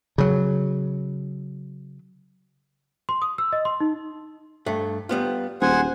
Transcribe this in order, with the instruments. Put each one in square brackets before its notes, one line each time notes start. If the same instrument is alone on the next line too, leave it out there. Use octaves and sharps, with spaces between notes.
[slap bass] C#3 F#3
[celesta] C6
D#6
E6
D#5
C6
D#4
[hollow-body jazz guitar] G2 A3
G3 B3 F4
[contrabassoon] D#1 [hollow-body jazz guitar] G#4 [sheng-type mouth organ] C5 F#5 G#5